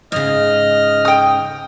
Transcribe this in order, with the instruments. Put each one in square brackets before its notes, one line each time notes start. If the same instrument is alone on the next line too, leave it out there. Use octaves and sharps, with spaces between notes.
[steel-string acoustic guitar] G#2 C#3 [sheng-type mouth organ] D#5 F6
[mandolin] G5 D#6